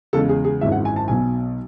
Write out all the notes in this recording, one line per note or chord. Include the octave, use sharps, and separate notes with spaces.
E2 C#3 G#3 A4
G#4
G#4
G#1 F#2 E3 G#3 E5
F#5
G#5
A5
B1 B2 F#3 G#5